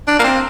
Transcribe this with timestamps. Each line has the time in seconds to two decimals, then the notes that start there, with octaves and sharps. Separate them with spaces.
0.08 D4
0.19 A#3
0.24 C4